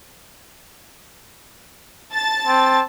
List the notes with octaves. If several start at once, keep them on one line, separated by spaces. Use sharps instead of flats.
A5 A6
C4